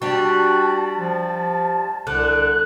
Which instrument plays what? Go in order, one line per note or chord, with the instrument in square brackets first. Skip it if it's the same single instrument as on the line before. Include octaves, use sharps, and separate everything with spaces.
[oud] G3 D4 [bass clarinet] F#4 [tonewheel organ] A5
[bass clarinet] F3
[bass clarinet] C2 [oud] D3 [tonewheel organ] F#6